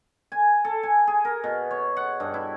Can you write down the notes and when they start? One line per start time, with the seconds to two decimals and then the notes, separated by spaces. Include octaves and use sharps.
0.32 G#5
0.65 A4
0.83 G#5
1.07 G#4
1.25 A#4
1.44 B2
1.71 C#5
1.97 F#5
2.20 G2
2.34 E4